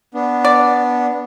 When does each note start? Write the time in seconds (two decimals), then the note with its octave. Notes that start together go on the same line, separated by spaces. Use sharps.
0.14 B3 D4
0.45 D5